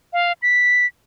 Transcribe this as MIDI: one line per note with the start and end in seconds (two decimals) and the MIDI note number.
0.13 0.33 77
0.42 0.86 95